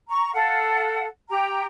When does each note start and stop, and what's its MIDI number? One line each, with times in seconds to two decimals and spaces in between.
0.08 0.31 82
0.08 0.31 85
0.33 1.06 69
0.33 1.06 77
0.33 1.06 78
1.29 1.65 67
1.29 1.65 79
1.29 1.65 82